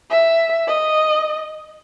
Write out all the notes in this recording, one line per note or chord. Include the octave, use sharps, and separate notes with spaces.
E5
D#5